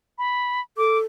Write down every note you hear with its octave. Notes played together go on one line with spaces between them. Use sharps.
B5
A4 D6